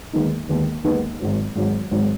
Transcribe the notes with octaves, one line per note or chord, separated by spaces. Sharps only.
D#2 D#3 G#3 B3 D#4
D#2 D#3 G#3 B3 D#4
D#2 D#3 G#3 B3 D#4
G#1 G#2 F#3
G#1 G#2 F#3
G#1 G#2 F#3